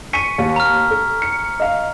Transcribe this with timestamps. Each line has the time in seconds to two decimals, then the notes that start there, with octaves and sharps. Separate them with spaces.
0.13 G#5 C#6 B6 C#7 D#7
0.38 D#2
0.56 A#5 F6
0.90 A4
1.22 C#7
1.60 D#5 F5